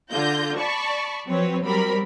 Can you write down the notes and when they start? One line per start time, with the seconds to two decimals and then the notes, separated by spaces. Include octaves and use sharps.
0.11 D3 F4 G6 A#6
0.58 D5 A5 B5 C#6
1.28 F3 F#3 C4 B4 C#5
1.63 F#3 G3 C4 A#4 B5 B6